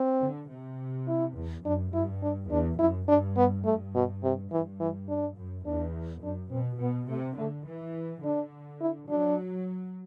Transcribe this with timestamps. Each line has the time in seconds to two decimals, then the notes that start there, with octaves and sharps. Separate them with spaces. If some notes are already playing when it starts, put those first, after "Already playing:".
Already playing: C4
0.22 D3
0.50 C3
1.08 E4
1.36 E2
1.65 F#2 D4
1.94 G2 E4
2.23 D4
2.51 E2 D4
2.79 F#2 E4
3.08 G2 D4
3.37 B3
3.65 G2 A3
3.95 B2
4.23 C3
4.51 G2 E3
4.80 E3
5.09 D4
5.38 F#2
5.66 E2 D4
6.23 F#2 D4
6.51 B2 C4
6.81 B2 B3
7.09 C3 A3
7.38 D3 A3
7.67 E3
8.23 D3 D4
8.81 E4
9.09 F#3 D4